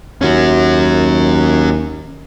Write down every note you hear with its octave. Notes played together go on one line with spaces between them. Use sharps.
D#2 C#4 F#4